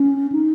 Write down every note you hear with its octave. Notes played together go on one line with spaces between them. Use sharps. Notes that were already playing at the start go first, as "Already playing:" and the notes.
Already playing: C#4
D#4